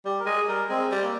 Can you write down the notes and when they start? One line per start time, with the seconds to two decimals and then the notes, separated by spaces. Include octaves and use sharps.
0.05 G3 G4
0.19 A#4
0.26 G#3 G#4
0.48 G3 A#4
0.70 G#3 C4
0.92 G3
1.02 A#3